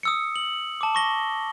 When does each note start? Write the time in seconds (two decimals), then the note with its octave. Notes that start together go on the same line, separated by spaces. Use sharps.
0.03 D#6 E6 C#7
0.36 F#7
0.81 A5 D6
0.95 C#6 A#6 G7